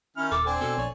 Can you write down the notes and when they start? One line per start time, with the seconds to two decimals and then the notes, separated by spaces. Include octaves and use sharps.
0.17 D#3 C#4 E4 F6
0.32 D#1 A4 D6
0.46 C4 D4 G#5
0.61 B2 A4
0.78 A#1 C#5 D5